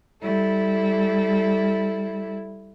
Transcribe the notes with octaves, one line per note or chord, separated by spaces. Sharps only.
G3 E4 A4